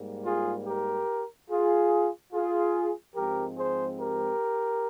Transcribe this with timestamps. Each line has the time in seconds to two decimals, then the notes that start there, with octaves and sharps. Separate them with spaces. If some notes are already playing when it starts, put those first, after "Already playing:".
Already playing: G#2 G3 A#3
0.25 F4 G#4
0.66 G4 A#4
1.50 F4 G#4
2.33 F4 G#4
3.15 G#2 F3 G#3 C4 G4 A#4
3.57 G#4 C5
3.99 G4 A#4